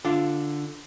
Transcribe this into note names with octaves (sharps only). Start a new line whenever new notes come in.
D3 D4 F4